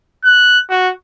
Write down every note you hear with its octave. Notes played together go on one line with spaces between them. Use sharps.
F#6
F#4